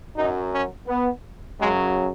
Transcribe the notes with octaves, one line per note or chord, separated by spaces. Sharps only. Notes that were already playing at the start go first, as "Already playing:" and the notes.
F#2 F#3 D#4
C#4
B3
F#2 C#3 F#3 G#3